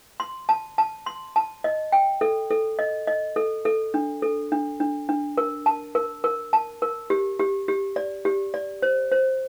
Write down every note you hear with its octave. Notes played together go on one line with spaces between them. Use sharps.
C6
A5
A5
C6
A5
D#5
G5
A4
A4
D#5
D#5
A4
A4
D4
A4
D4
D4
D4
A#4
A5
A#4
A#4
A5
A#4
G4
G4
G4
D5
G4
D5
C5
C5